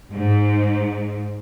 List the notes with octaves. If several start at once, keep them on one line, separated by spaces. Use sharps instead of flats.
G#2